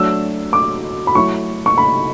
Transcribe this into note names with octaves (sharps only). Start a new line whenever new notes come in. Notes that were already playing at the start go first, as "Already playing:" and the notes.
Already playing: F#3 A3 D4 E6
D6
B5
F#3 A3 E4 C#6
C#6
B5